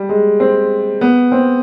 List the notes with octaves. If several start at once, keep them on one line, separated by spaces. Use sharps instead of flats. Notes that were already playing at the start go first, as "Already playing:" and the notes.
Already playing: G3
G#3
C4
B3
C4